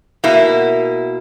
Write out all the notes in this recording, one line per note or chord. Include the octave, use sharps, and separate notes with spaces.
B2 A#3 E4